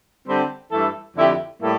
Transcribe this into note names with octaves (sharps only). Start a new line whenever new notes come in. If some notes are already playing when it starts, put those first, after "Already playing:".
D3 G3 C4
G2 E3 A3 E4 A4
F2 D3 A3 E4 G4
A2 G3 A#3 E4 A4